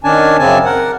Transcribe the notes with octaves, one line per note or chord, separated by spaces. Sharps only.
D#3 C#4 D4 G#5 A5
F#2 C#3 C4 G#5 A5
A#4 F#5